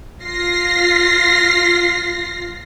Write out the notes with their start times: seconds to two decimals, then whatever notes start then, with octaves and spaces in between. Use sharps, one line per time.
0.24 F4 A#6 C7